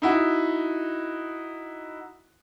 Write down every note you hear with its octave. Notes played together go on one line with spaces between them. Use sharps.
D#4 E4 F#4